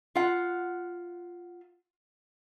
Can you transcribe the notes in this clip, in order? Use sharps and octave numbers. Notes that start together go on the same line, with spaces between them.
F4 F#5